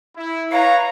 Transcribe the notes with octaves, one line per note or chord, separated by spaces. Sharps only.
E4
B4 C#5 F5 A#5